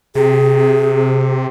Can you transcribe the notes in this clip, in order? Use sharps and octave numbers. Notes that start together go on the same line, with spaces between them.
C3 G#4